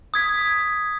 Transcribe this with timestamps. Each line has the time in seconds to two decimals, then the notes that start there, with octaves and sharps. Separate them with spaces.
0.14 D#6 G#6 B6